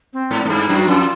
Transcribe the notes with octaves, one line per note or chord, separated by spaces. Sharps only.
C4
G#2
G#2
G2 E4
F#2
F#4
F2 F4